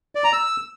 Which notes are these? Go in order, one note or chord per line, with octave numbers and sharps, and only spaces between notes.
D5
A#5
E6